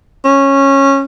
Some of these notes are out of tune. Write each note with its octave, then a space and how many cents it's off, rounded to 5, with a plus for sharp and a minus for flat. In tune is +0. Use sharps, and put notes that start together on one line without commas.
C#4 -15